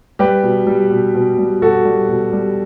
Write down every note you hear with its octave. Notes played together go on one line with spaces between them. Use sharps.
G3 G4 B4
B2
G3
B2
B2
G3
B2 F#4 A4
G3
B2
G3